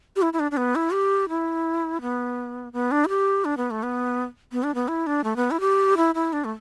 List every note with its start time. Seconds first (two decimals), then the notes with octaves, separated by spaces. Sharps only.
0.16 G4
0.22 E4
0.33 E4
0.40 D4
0.51 D4
0.57 B3
0.75 E4
0.93 G4
1.29 E4
2.01 B3
2.73 B3
2.91 D4
3.05 E4
3.08 G4
3.45 D4
3.57 B3
3.71 A3
3.83 B3
4.52 B3
4.63 D4
4.75 B3
4.88 E4
5.07 D4
5.24 A3
5.36 B3
5.51 E4
5.60 G4
5.97 E4
6.15 E4
6.33 D4
6.45 A3